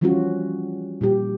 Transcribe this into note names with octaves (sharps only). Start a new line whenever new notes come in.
E3 F3 G3 C#4 F4 F#4
A#2 G3 G4